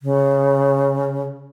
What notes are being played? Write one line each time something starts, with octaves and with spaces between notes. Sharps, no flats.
C#3